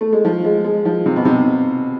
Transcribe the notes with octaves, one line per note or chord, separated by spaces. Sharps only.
A3
G#3
F3
G#3
G#3
F3
C3
B2
C3